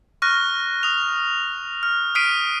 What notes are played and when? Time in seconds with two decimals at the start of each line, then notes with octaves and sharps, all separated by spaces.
0.22 C#6 F6 F#6 A#6
0.83 D#6 F7
1.83 F6
2.15 D#6 F6 B6 C7 D7 D#7